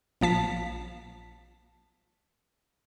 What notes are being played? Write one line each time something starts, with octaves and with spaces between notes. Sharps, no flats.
A#1 F3 A5 B6